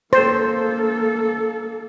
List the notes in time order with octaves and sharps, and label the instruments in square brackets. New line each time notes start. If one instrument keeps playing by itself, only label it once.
[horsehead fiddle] A#3 A4 [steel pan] C5